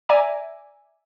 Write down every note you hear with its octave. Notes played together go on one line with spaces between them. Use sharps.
D5 E5 G#5 A#5 D6